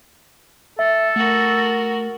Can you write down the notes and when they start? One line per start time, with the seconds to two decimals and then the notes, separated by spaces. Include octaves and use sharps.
0.79 A4 E5
1.16 A3 F#4 A#4